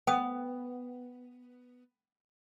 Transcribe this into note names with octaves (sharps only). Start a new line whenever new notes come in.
B3 G5 D#6